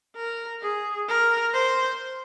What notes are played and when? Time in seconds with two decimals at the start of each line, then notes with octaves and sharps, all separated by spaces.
0.16 A#4
0.62 G#4
1.08 A#4
1.54 C5